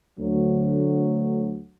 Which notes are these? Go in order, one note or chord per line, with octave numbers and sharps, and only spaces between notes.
D2 F#3